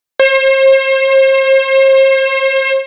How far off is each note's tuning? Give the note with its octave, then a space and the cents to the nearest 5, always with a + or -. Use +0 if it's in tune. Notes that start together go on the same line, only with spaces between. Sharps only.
C5 +40